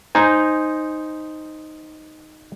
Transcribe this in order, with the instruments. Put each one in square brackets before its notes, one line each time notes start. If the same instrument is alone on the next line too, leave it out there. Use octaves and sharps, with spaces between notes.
[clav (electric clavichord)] D#4 C5 G#5